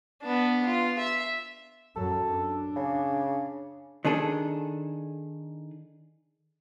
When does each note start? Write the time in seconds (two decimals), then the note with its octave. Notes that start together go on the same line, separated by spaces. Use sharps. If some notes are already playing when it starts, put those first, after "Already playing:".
0.22 B3 D4
0.66 F4
0.99 E5
1.96 F#2 F#3 A4
2.30 D4
2.76 C#3
4.05 D#3 D4 G#4 A4